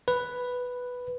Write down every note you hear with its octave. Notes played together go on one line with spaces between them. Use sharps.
B4